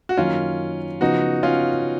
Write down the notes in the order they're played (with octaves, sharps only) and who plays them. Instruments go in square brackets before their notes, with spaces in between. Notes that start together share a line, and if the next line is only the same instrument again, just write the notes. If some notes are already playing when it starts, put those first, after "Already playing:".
[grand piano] F#4
[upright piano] F#2 D#3 A#3 D#4 [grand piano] C#4 F4
[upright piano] C#3 F3 B3 [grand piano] D#4 F#4
[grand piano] C#4 F4